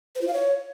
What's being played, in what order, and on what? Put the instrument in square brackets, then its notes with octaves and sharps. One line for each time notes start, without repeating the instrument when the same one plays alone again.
[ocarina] C5
F4
F5
C#5